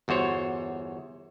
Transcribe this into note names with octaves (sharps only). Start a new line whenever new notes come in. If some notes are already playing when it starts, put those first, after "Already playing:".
G1 E2 F#4 C5 C#5